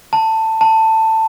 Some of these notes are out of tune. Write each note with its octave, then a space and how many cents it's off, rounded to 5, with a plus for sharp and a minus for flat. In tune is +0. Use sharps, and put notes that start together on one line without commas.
A5 +15
A5 +15